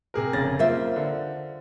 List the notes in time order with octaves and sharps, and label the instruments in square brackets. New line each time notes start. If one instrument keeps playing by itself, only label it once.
[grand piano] C3 G#4 A#4
[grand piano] F1 A6 A#6 [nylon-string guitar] C#3
[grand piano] A#3 [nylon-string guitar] F4 C5 E5
[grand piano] D3